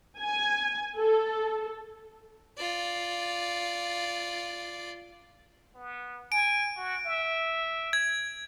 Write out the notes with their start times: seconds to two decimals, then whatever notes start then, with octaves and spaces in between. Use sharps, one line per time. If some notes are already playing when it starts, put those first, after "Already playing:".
0.19 G#5
0.97 A4
2.57 F4 D5
5.75 B3
6.32 G#5 D7
6.77 F#4
7.06 E5
7.93 G#6